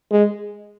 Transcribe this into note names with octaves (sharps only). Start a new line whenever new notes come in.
G#3